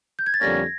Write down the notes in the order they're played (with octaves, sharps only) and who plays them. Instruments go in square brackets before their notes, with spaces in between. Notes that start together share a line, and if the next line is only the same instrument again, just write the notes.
[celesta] G6
G#6
A6
[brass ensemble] F2 D3 G3 A#3 C#4 [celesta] G#6 A#6